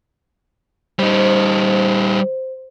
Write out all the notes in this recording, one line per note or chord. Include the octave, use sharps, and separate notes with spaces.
G3 D#4 C5